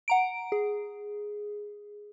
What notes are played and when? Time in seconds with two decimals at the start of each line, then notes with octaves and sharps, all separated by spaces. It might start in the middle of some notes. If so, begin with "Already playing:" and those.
0.08 F#5 A#5 D7
0.52 G#4